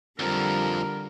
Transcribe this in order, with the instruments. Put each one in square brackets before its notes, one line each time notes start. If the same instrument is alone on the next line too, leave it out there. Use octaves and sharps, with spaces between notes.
[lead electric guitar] F2 F3 [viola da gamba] D3 G3 [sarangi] A#4